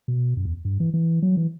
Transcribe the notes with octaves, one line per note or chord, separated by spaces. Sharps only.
B2
F#2
E2
G2
E3
E3
F#3
E3